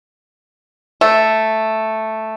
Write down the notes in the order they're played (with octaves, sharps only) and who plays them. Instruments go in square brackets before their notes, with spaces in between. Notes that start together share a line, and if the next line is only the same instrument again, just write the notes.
[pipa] A3